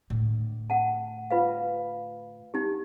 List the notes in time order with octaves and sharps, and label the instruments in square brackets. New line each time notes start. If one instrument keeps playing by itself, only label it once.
[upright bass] A2 D3
[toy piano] F#5 A5
F4 B4 F5
D#4 G4